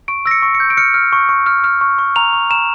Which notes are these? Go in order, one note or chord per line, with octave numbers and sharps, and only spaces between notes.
C#6 D7
E6 A#6
C#7
C#6
C#7
G6
D7
F6 C#7
F6
C#6
C#6
F6
F6
C#6
C#6
A#5 F7
C#6
A#5 E7